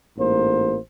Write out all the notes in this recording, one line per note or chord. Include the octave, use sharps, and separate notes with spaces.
A1 G#2 A#3 C5